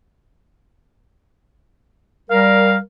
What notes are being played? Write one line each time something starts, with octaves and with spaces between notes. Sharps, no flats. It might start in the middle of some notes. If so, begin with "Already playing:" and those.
G3 A#4 F5